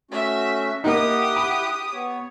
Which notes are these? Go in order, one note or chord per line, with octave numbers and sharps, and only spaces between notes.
A3 C#4 F#4 E5
A#3 D#4 E4 G4 F#5 D#6
B5
B3 C#5